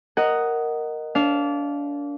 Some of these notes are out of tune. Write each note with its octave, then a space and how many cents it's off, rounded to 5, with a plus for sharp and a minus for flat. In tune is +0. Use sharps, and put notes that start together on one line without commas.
A#4 +0 D#5 +0 F#5 +10
D4 -30 F5 +0